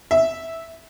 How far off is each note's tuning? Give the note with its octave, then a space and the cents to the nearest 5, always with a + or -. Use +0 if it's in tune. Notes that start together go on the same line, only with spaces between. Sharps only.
E5 -10